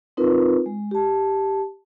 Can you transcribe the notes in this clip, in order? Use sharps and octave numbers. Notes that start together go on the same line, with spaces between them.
C4 D#4 F4 A#4 B4
G#3
G4 A5